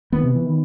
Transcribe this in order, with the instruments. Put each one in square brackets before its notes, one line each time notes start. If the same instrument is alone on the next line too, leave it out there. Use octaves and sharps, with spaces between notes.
[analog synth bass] D#3 [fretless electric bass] B3
[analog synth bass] C3
E3
D#3